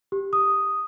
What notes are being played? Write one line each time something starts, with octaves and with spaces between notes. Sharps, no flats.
G4
D#6